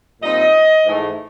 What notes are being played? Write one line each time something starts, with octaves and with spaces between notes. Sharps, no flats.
A#2 G3 C4 D#4 D#5
G#2 E3 A3